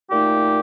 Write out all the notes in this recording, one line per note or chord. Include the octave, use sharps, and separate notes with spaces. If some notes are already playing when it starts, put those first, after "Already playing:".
A#2 A3 D#4 G4